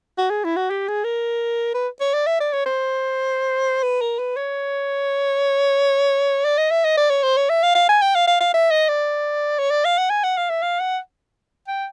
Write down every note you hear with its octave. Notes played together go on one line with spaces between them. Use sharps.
F#4
G#4
E4
F#4
G4
G#4
A#4
B4
C#5
D5
E5
D5
C#5
C5
B4
A#4
B4
C#5
D5
D#5
E5
D#5
D5
C#5
C5
C#5
E5
F5
F5
G#5
G5
F5
F5
F5
E5
D#5
D5
C#5
D5
F5
F#5
G#5
F#5
F5
E5
F5
F#5
G5